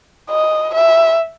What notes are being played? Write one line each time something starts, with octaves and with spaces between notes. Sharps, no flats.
D#5
E5